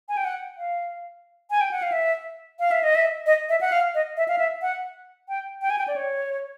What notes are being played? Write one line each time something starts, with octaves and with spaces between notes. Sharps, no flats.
G#5
G5
F#5
F5
G#5
G5
F#5
F5
E5
F5
E5
D#5
E5
D#5
E5
F#5
F5
D#5
E5
F5
E5
F#5
G5
G5
G#5
G5
D5
C#5